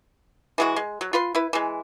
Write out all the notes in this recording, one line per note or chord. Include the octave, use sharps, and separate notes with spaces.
E3 G#3 F#4
G#3
F#3
F4 B4 C6
E4 B4
E3 G#3